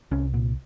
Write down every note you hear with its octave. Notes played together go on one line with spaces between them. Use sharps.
C2 C#4
A#2